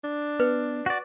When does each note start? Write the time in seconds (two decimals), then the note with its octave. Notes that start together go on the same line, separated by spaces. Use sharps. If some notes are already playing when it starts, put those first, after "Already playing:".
0.04 D4
0.40 B3 B4
0.86 F#4 D5